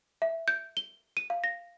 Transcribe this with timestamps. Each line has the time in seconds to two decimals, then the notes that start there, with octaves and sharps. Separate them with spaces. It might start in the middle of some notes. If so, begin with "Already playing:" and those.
0.22 E5
0.48 G6
0.77 G7
1.17 D#7
1.30 F5
1.44 A#6